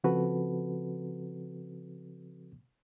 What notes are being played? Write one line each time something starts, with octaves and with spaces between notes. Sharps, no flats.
C#3 F3 C4 F#4 A4 B4